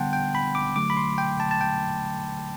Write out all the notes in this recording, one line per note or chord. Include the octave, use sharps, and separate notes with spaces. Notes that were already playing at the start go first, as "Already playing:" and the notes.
Already playing: D3 G3 B3 F#5 G5 A5 C6
G5
B5
D6
D3 F#3 A3 D6
B5
C6
G5
A5
A5
G5